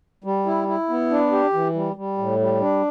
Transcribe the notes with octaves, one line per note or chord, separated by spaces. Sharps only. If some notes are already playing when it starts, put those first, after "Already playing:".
G3
E4
E4
B3
D4
G4
E3
G3
G3
A2
G3
D4